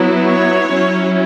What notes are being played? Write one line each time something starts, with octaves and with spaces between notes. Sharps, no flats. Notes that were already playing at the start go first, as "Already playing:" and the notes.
Already playing: F#3 B3 E4
C#5
F#3 C#4 E4